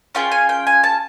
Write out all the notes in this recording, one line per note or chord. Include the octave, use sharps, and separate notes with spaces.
C#4 F4 G#4 G5
G#5
G5
G#5
A5